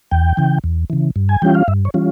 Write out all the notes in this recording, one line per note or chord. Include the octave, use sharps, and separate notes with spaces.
E2 G5
C#3 E3
E2
C#3 E3
G2
G#5
E3 G3 C#4 F4 G5
F5
G2 E5
C#5
E3 G3 C#4 F4